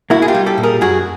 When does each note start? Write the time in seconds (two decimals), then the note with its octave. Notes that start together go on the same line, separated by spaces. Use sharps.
0.10 A#3 E4 F#4
0.22 G#4
0.28 F4 G4
0.34 G3
0.46 G4 A4
0.58 A#2
0.63 G#4 A#4
0.81 F#2 F#4 G#4